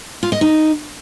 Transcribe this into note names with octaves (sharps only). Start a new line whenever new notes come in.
F4
D#5
D#4